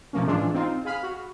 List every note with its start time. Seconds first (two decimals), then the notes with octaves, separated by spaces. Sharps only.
0.13 B2 F3 A3 A#3 C#4
0.27 A2 E3 G#3 D4 F4 G#4
0.54 C4 D#4 F4
0.85 G#4 F5 B5 F6
1.03 F#4